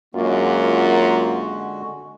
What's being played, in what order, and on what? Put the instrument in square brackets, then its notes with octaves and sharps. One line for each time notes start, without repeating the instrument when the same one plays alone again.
[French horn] F#2 [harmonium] D3 G#3 F#4 [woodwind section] A#3 F4